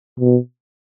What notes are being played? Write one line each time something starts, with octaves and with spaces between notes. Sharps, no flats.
B2